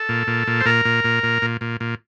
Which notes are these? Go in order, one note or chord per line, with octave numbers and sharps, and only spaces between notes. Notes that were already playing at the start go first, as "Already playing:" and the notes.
Already playing: A4
A#2
A#2
A#2
C5
A#2 A#4
A#2
A#2
A#2
A#2
A#2
A#2